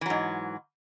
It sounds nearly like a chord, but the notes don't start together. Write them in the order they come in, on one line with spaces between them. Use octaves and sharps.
E3 F#3 G#2